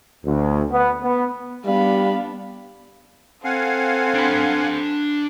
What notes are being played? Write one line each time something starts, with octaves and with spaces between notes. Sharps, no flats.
D2
B3
B3
G3 B3 D4 F5 B5
C4 A4 F5 F#5 G#5
D4 B5